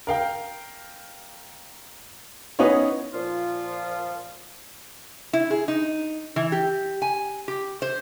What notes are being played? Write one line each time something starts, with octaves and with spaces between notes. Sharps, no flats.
A#4 F5 G5
B3 C#4 D#4 E4 C#5
A#2 F3 F4
E4
G#4
D#4
E3
G4
G#5
G4
C5